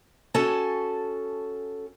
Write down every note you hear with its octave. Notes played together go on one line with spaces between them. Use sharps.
C#4 F#4 A4 G#5 A5